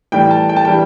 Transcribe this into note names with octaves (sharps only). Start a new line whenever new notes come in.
A2 E3 G3 G5
A5
G5
A5
E3 G3 G5